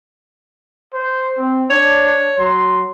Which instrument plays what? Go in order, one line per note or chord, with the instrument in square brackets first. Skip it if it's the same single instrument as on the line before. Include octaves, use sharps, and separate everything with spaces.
[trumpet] C5
C4
[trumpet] D4 [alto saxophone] C#5
[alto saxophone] C#5
[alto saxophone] F#3 [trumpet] C6